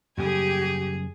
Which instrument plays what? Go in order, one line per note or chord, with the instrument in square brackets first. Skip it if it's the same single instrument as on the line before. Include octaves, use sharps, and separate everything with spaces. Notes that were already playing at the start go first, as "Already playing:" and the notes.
[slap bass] F#2 C#3 G3 [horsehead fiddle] G4 [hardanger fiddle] G#4 G#5